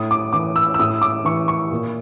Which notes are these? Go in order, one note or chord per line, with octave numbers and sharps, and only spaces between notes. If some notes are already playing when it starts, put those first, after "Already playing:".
Already playing: A2 D#6
D6
E3 D6
E6
E6
A2 D#6
D6
E3 C#6
C#6
A#2